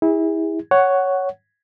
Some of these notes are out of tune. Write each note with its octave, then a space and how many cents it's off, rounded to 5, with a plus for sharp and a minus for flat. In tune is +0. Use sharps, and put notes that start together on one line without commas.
E4 -25 G#4 -35
C#5 +5 F#5 +5